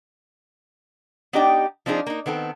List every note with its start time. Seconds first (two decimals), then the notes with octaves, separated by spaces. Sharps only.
1.33 B3 D4 D#4 G4 D#5 G5
1.86 F3 C4 D4 D#4 G#4
2.07 A#3 D#4
2.26 D#3 B3 C4 A4